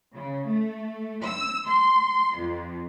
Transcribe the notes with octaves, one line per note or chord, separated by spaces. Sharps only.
C#3
A3
E6
C6
F2